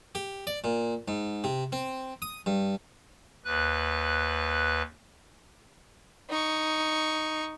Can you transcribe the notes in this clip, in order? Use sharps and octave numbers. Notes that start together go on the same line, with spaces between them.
G4
D5
A#2
G#2
C3
C4
D#6
G2
D#2 B4 F#6
D#4 C#6